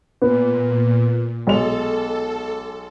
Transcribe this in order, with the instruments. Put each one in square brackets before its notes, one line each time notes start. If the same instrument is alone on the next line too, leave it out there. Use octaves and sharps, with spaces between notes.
[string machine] A#2 [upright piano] B3
[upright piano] B1 G#3 F7 [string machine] A4